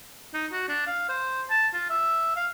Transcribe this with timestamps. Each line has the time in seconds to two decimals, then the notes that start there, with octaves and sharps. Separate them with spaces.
0.34 D#4
0.52 F#4
0.69 D4
0.87 F5
1.09 C5
1.50 A5
1.73 F4
1.90 E5
2.36 F5